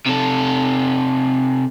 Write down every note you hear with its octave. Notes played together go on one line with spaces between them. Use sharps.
C3 A4